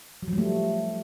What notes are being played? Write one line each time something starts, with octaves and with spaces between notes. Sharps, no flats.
F#3
F3
G3
A3